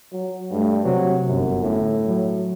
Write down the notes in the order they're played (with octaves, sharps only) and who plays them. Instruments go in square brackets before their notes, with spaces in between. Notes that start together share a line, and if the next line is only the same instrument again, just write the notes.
[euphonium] F#3
[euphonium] G2 [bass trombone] A3
[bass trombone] C3 [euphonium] F#3
[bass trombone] G1 [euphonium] F#2
[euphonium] A2
[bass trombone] F#3